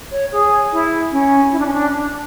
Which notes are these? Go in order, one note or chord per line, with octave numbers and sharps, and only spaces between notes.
C#5
G#4
E4
C#4
E4
D4
C#4
D4
D4